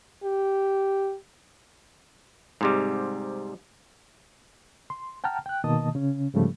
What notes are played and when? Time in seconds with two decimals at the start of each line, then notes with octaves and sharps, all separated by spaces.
0.24 G4
2.61 G#2 C3 G3
4.90 C6
5.24 F#5 G5 A5 A#5 F6
5.46 G5 F#6
5.64 B2 D#3 A#3 D#5 A5 D#6
5.95 C#3 C#4
6.34 G#2 C#3 F3 G3 A3